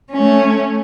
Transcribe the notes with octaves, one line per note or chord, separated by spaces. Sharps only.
A3 C#4